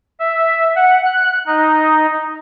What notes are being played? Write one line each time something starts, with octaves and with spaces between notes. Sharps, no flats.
E5
F#5
F#6
D#4